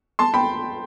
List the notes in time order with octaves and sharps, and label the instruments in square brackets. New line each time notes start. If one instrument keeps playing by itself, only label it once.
[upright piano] A5 C6
G5 B5